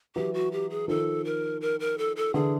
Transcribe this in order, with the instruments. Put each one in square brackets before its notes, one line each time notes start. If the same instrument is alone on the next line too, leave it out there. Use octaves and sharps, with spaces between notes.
[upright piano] E3 F#3 [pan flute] G4
[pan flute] F#4
G4
G#4
[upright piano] D#3 F3 [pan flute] A4
[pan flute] A#4
A#4
A#4
A4
A4
[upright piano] D3 E3 [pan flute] G#4